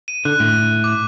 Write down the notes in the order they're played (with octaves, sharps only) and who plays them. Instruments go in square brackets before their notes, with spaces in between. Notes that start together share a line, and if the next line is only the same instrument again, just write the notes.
[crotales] D#7
[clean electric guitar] D3 [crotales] F#6
[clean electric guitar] A2
[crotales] D6